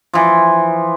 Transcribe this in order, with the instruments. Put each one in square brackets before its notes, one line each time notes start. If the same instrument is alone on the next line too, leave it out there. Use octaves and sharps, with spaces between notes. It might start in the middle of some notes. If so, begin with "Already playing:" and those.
[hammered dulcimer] E3 F3